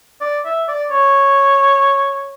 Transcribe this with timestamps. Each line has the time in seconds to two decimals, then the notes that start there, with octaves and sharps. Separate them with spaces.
0.21 D5
0.45 E5
0.68 D5
0.91 C#5